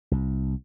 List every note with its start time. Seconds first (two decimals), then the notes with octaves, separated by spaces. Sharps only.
0.11 C2